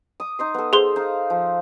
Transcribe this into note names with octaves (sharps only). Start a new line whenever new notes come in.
D6 D#6
D#4 D#5 C6
B3 A4
G#4 A4 C5 C6
D#4 F5
F3